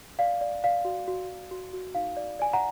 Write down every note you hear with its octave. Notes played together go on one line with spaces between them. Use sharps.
D5 F5
D5
D5 F5
F#4
F#4
F#4
F#4
F#4
D#4 F5
D5
D5 G#5
F#5 A#5